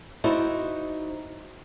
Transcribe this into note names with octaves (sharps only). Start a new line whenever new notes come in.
D#4 E4 F#4 C5 D5 D#5